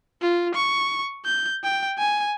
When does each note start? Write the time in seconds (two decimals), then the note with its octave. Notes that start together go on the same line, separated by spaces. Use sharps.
0.22 F4
0.55 C#6
1.25 G6
1.64 G5
1.99 G#5